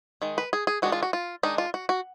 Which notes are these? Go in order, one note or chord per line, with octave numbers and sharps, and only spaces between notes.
D#3 G#3
B4
G#4
G#4
D#3 G#3 D4 F#4
F4
F#4
F4
D#3 G#3 D4 D#4
F4
F#4
F#4